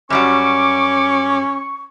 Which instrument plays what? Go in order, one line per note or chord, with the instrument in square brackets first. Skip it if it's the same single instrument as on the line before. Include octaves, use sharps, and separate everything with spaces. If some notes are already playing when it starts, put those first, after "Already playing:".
[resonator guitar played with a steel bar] F#2 G3 F#4 [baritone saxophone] C#4 [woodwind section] C#6 [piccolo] D6